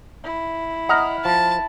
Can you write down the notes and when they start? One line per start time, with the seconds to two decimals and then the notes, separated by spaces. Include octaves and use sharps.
0.24 E4
0.89 D#5 F#5 A#5 F6
1.25 F3 A5